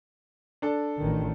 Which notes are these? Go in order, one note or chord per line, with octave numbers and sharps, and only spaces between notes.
D4 A4
A1 D#3